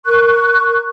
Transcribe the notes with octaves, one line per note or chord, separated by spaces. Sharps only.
A#4 C#6 F#6